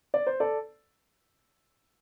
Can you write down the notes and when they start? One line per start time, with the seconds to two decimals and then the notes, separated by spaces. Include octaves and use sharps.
0.14 D5
0.27 C5
0.40 A4 D5